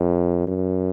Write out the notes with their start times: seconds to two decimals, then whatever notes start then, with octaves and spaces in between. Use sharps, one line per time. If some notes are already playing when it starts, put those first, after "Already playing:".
Already playing: F2
0.47 F#2